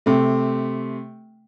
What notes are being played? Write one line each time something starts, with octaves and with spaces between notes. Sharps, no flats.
C3 A3